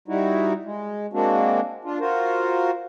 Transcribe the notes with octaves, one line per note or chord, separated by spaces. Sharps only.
G3 D#4 E4 F#4
G#3
G#3 A#3 C4 D4 F#4
D4 F4
F4 F#4 A#4 C5